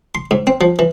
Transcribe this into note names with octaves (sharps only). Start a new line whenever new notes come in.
C6
G#2
C4
F3
E3